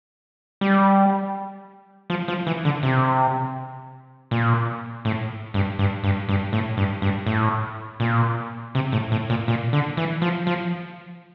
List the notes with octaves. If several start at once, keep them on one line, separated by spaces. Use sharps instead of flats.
G3
F3
F3
E3
D3
C3
A#2
A2
G2
G2
G2
G2
A2
G2
G2
A2
A#2
C3
A2
A2
A#2
A#2
D3
E3
F3
F3